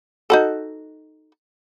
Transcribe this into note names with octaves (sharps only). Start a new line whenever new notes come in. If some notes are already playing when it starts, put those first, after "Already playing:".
D#4 F#4 A4